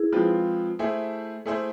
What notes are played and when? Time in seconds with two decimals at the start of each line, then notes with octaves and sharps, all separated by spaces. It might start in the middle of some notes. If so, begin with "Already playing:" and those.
Already playing: E4 G#4
0.12 F3 G#3 C4 F4 B4
0.79 A3 E4 G#4 C5 E5
1.46 A3 E4 G#4 C5 E5